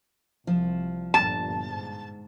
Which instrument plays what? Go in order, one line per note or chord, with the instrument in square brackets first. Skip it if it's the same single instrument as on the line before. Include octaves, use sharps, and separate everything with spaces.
[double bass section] C2 [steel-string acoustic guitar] F3
[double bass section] G1 A#2 [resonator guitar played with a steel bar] A5
[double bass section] G#2